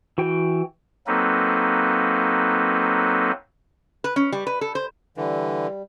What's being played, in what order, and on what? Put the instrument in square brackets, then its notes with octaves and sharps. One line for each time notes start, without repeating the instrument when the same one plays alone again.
[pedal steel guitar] E3 F#4 G5
[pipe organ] F#3 A#3 C4 D#4 A4 B4
[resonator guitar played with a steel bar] B4
C#4
G3
B4
A4
C5
[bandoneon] D3 E3 [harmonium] G3